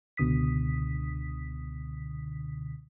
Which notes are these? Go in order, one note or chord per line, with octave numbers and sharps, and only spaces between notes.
C#2 B2 D3 D#6 B6